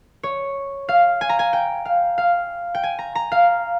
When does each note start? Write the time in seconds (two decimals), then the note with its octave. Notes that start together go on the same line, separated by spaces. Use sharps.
0.23 C#5
0.89 F5
1.21 G#5
1.29 A#5
1.39 G#5
1.53 G5
1.85 F5
2.18 F5
2.75 G5
2.83 G#5
2.99 A#5
3.15 A#5
3.32 F5